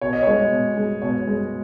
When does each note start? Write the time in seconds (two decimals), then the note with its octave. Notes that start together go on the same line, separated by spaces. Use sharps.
0.01 B2 C#5
0.13 D#5
0.23 G#3 C#5
0.51 B2
0.77 G#3
1.02 B2 C#5
1.27 G#3